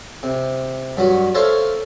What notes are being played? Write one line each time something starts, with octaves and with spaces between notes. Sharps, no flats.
C3
G2 F#3 F#4
A4 A#4 C5 C#5 E5 F5